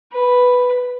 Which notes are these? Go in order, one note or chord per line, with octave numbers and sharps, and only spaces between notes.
B4